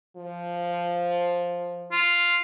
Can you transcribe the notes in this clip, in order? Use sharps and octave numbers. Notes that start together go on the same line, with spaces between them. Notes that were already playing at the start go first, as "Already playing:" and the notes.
F3
F4